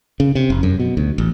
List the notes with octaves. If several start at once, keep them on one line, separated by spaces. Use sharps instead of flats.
C#3
C3
F1
F#2
B2
D2
A1